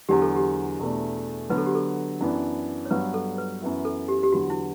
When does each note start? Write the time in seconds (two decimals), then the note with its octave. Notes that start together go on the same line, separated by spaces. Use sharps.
0.09 E2 D3 F#3 G4
0.22 A4
0.36 G4
0.79 E2 B2 A3 D4
1.50 D3 F#3 B3 B4
1.58 A4
1.66 G4
1.75 A4
2.21 F#2 E3 B3 D4
2.86 C#5
2.90 G2 F#3 B3 B4
3.14 A4
3.38 B4
3.61 F#2 E3 B3 E4
3.85 A4
4.08 G4
4.23 G4
4.32 E2 D3 F#3 B3 F#4
4.50 E4